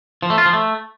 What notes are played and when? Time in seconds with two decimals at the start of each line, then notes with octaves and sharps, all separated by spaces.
0.22 F3
0.30 A3
0.38 F4
0.45 F3
0.53 A3